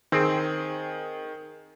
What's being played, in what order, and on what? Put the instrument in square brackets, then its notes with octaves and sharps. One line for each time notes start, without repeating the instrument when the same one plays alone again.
[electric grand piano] D#3 G#4 [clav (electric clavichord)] C4